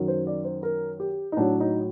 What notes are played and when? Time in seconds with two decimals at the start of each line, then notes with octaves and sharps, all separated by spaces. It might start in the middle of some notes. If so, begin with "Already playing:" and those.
Already playing: F#2 D#3 F#3
0.08 C5
0.27 D5
0.45 C5
0.63 A#4
1.00 G4
1.32 D#4
1.37 A2 F#3 D4
1.60 D#4